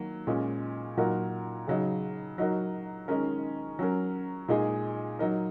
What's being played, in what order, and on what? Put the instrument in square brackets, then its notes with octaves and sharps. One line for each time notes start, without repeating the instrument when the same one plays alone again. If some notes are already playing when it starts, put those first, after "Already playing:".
Already playing: [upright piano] D#3 F#3 A#3
A#2 G#3 C#4
A#2 F#3 D#4 F#4 A#4
C#3 F#3 D#4
F#3 D#4 F#4 A#4
D#3 G#3 C#4 A#4
F#3 C#4 A#4
A#2 G#3 D#4 G#4
F#3 D#4 A#4